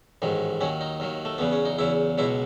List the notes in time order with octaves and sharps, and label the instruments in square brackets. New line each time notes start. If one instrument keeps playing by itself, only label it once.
[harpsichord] A1 G#2 D#3 F#3
D#2 D#3 F#3 C#4
D#4
D#2 D#3 F#3
A3
E2 C#3 F#3 B3
C#4
D#4
E2 C#3 F#3 E4
C#2 B2 F#3 E4